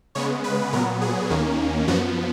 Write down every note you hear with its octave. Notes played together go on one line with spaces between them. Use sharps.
C#3 G#3 B3 C#5
B4
A#2 F#3 B3 A#4
G#4
D#2 D#3 A#3 C#4
F#2 F3 B3 F#4